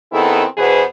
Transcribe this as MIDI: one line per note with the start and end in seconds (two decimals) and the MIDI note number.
0.12 0.43 51
0.12 0.43 59
0.12 0.43 60
0.12 0.43 64
0.12 0.43 68
0.12 0.43 69
0.57 0.81 40
0.57 0.81 47
0.57 0.81 59
0.57 0.81 68
0.57 0.81 71
0.57 0.81 72